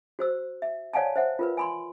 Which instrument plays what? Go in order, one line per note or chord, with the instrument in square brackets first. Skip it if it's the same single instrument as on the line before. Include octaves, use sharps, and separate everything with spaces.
[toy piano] F#4 C5 E6
E5
C#5 D5 F5 F#5 G#5 A5
C5 E5 F#5
F4 A#4 B4
G#5 B5 C6